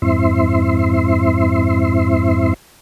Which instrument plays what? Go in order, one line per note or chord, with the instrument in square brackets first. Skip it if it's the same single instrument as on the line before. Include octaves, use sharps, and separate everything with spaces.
[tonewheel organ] F2 G#2 C4 E4 E5 C6